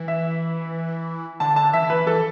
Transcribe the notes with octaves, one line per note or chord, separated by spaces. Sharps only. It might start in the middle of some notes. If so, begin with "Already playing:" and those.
Already playing: E3
E5
D3 A5
A5
E3 E5
B4
E3 A4